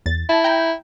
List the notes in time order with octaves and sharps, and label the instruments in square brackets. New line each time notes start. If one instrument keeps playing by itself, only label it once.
[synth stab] E2 A6
[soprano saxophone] E4 [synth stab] A5
[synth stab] G5 A#5 G6